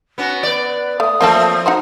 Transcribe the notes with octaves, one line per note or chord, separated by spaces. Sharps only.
B3 C#4 F#4
B3 B4 D5
A3 D#6
F3 A3 A#3 C4 E4 A4
D#4 F#4 C5